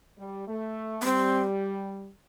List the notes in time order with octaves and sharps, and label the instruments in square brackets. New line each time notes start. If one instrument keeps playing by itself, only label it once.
[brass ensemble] G3
A3
[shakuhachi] B3
[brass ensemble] G3 [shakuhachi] C4